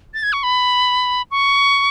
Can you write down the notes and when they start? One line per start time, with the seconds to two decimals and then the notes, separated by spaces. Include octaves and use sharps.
0.14 A6
0.23 G#6
0.33 C#6
0.43 B5
1.31 C#6